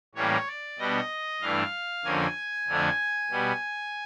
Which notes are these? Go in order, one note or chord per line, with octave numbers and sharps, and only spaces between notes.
A2 E3 G3 A#3 C#4 C#5
D5
B2 G3 B3 D4 D#5
G2 E3 A3 D4 F5
F2 D3 F3 A#3 C#4 G#5
F2 D3 F3 A3 D4
B2 G3 B3